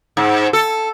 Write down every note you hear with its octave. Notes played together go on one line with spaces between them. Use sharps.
G#2
A4